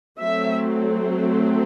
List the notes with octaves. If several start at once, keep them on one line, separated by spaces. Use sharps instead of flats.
F#3 A3 C4 E5